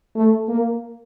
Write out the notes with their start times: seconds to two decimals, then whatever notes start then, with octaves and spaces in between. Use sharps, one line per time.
0.16 A3
0.49 A#3